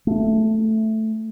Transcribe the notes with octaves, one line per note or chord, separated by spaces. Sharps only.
A3